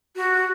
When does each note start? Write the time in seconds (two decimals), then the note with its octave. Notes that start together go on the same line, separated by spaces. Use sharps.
0.16 F#4